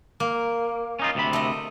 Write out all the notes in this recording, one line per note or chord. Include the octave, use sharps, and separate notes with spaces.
A#3
C#4 D#4 F4
D2 C3 B5
A3 D#5